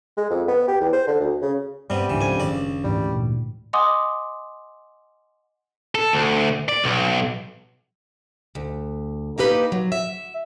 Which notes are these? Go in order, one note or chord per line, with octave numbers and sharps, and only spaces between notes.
G#3
F2
B3
G4
E2
C5
D3
D2
C#3
G2 C3 G3 B3
C#2 G#2 C#3 E3 D4
F2 G#5
F#1 C#2 A#2 D#3 D5
D2 G#2 E3 G3
A#2
D#5 F#5 G#5 C6 D6 D#6
A4
D2
D5
B1
D2
A#3 D#4 G4 B4
F#3
E5